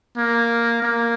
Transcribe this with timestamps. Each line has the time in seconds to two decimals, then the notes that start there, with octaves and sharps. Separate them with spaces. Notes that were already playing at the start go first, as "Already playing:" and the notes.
0.17 A#3
0.82 A#3